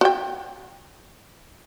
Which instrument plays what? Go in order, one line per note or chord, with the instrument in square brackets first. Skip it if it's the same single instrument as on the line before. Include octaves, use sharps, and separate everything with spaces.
[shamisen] F#4 G5